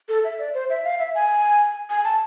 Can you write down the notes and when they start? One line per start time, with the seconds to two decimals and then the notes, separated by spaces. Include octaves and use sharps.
0.09 A4
0.24 E5
0.39 D5
0.54 C5
0.70 E5
0.84 F5
0.99 E5
1.15 G#5
1.90 G#5
2.04 A5